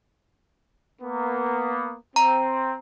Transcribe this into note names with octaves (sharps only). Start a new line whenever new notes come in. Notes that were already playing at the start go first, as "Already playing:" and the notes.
A#3 B3
C4 A#5